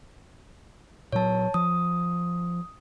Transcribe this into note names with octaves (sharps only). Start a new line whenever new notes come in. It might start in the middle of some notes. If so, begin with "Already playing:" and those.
A#2 F#3 C#5 A5
F3 D#6